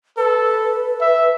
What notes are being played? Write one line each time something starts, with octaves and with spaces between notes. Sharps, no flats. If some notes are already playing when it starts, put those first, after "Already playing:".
A4 B4
E5